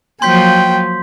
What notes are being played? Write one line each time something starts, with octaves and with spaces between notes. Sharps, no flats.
F3 F#3 A#3 G5 C6 G6 B6